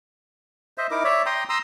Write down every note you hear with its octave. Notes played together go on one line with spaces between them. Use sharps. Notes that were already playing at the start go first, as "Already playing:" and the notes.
C5 D#5 E5
D#4 E4 A#4 D6
C#5 D5 E5
G5 A#5 C6 D#6
A#5 C6 D#6 E6